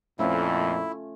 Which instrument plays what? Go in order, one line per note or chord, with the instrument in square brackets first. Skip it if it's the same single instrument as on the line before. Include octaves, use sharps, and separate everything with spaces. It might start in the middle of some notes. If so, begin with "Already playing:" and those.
[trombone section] F2 A#2 [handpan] A3 C#4 F4 [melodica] E4